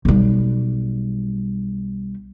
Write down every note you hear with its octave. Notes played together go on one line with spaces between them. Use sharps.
B1 G3